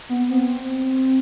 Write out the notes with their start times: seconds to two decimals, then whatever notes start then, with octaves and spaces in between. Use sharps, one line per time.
0.09 B3
0.31 C4